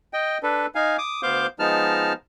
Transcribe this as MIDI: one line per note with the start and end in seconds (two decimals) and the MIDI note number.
0.13 0.38 75
0.13 0.38 79
0.43 0.66 62
0.43 0.66 69
0.43 0.66 71
0.75 0.97 63
0.75 0.97 77
0.75 0.97 80
0.98 1.22 86
0.98 1.22 87
1.23 1.47 38
1.23 1.47 59
1.23 1.47 72
1.23 1.47 77
1.23 1.47 86
1.23 1.47 91
1.59 2.13 53
1.59 2.13 56
1.59 2.13 59
1.59 2.13 63
1.59 2.13 81
1.59 2.13 89